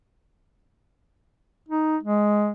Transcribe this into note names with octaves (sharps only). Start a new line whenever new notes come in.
D#4
G#3